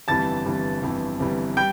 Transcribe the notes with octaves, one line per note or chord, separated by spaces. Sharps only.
G1 F2 E3 G3 A5 A6
G1 F2 E3 G3
G1 F2 E3 G3
G1 F2 E3 G3
G3 G5 G6